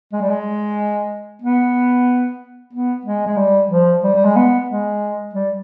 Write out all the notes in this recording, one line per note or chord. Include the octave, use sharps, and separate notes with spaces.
G#3
G3
G#3
B3
B3
G#3
G#3
G3
F3
G3
G3
G#3
B3
G#3
G3